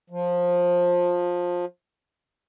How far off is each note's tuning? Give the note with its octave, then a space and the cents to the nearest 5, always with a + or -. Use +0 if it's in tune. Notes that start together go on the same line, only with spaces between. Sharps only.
F3 +20